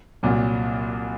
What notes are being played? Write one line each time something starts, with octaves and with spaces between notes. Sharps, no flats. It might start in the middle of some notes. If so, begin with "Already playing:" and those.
C2 A#2 F#3